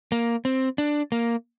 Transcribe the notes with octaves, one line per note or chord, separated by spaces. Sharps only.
A#3
C4
D4
A#3